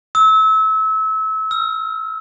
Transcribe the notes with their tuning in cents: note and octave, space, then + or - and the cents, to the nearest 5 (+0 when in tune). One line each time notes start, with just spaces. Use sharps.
E6 -30
E6 +45